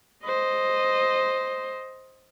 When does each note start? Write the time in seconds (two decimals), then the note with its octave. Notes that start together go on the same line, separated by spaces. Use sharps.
0.24 C5 D#5